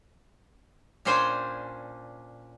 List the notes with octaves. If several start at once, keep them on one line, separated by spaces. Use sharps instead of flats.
A#2 C#4 D4 C5 G5 G#5